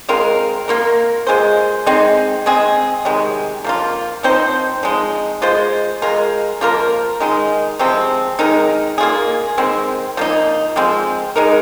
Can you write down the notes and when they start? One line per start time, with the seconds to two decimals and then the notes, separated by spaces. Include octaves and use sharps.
0.09 G#3 C4 F4 A#4
0.68 A#3 F4 A#4
1.27 G#3 F4 G#4 C5
1.86 G#3 C4 D#4
2.46 G#3 C4 G#4
3.05 C3 D#3 G#3
3.64 F3 A#3 F4
4.23 F3 C4 D#4 C5
4.83 F3 G#3 D#4
5.42 G#3 F4 C5
6.02 G#3 F4 A#4
6.61 F3 A#3 F4 A#4
7.20 D#3 G#3 D#4
7.79 C3 F3 G#3 C4
8.39 D#3 G#3 D#4 A#4
8.98 A#3 F4 G#4
9.58 D#3 G#3 C4
10.17 F3 A#3 D#4
10.76 F3 G#3 C4
11.36 G#3 D#4 A#4